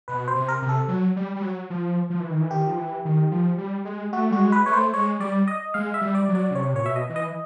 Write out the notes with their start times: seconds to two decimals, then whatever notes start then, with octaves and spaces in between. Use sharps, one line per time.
0.08 B2 B4
0.28 C5
0.35 C3
0.49 A#4
0.62 C3
0.69 A4
0.88 F#3
1.16 G3
1.36 G3
1.42 F#3
1.70 F3
2.10 F3
2.20 E3
2.30 D#3
2.40 E3
2.51 D#3 G4
2.67 F3
2.77 E3
3.05 D#3
3.31 F3
3.58 G3
3.85 G#3
4.12 A3 F#4
4.31 G3 F#4
4.39 G#3
4.52 B4
4.66 A3 C#5
4.73 C5
4.93 G#3 C#5
5.20 G3 D5
5.48 D#5
5.74 G#3 F5
5.94 E5
6.01 G3
6.15 D5
6.29 F#3
6.35 D5
6.51 C#3
6.55 C3 C#5
6.74 A#2 C#5
6.82 B2 E5
6.96 D#5
7.09 E3
7.16 D#5